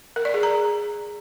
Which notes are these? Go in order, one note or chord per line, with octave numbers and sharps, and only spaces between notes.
A#4
D5
G#4
A#5